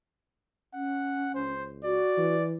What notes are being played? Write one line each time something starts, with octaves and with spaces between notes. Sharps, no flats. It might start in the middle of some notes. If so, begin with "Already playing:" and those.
C#4 F#5
C#2 C5
F#4 D5
E3